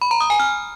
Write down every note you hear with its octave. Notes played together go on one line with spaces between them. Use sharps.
B5
A#5
D#6
G#5
F6